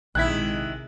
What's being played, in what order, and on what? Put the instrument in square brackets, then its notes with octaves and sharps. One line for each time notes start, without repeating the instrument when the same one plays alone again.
[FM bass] A#1 [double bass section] C3 G#3 [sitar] D#3 E4 [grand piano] F#6 G#6 B6